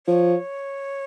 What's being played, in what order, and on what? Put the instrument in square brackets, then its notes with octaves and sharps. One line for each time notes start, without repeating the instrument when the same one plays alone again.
[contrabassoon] F3 [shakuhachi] C#5